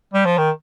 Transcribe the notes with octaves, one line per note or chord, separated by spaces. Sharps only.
G3
F3
D#3